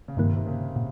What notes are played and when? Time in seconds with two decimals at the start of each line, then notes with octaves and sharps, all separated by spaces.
0.08 C#3
0.17 G2 C3 D#3 A#3
0.36 C3
0.46 C#3
0.76 A#2